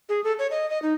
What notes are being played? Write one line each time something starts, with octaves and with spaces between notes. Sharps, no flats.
G#4
A4
C#5
D#5
D#5
D#4